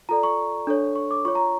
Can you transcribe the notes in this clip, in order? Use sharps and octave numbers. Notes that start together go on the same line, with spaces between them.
F4 A4 D5 A#5
C#6
D4 A4 C#5
C#6
D6
F4 C#5 C#6
A#5